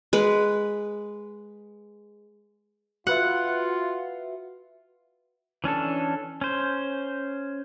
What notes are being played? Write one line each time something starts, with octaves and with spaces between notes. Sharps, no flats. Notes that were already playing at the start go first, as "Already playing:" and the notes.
G#3 B4
F4 F#4 B4 E5 F#5
E3 C#4 D4 A4
C#4 C5